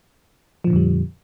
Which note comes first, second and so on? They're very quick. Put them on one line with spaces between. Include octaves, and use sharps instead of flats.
F3 A#2 D3 F2 G3